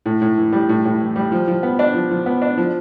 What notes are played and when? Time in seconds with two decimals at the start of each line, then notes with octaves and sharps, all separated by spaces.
0.06 A2
0.22 A2
0.38 E3
0.53 G3
0.69 A2
0.85 A2
1.00 E3
1.16 G3
1.32 F3
1.47 F3
1.63 B3
1.79 D4
1.94 F3
2.11 F3
2.26 B3
2.42 D4
2.57 F3